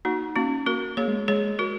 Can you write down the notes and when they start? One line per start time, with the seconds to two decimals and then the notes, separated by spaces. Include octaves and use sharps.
0.05 A#3 D#4 F#4
0.36 A#3 C#4 F#4
0.66 A#3 F#4 A#4
0.97 A#3 G#4 C#5
1.08 G#3
1.28 G#3 G#4 C#5
1.59 F#4 A#4